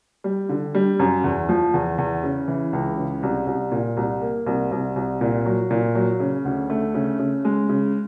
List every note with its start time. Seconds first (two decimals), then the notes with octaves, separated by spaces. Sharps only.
0.24 G3
0.49 D3
0.75 G3
0.99 F#2
1.24 E2
1.49 F3
1.74 E2
1.98 E2
2.23 C#3
2.48 E3
2.73 C#2
2.97 C#3
3.23 C2
3.47 C2
3.72 A#2
3.97 C2
4.22 A#3
4.47 C2
4.72 C2
4.96 C2
5.21 A#2
5.46 F#3
5.71 A#2
5.95 F#3
6.20 C#3
6.45 D2
6.70 A3
6.94 C#3
7.19 C#3
7.45 G#3
7.69 C#3